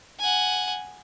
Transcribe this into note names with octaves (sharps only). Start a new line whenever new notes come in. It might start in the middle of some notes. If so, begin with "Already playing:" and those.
F#5 G#5